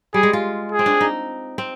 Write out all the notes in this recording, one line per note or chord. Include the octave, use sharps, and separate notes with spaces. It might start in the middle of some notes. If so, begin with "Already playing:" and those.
G3 G#4
G#3
F4
G#4
C4
D4
D#4
C4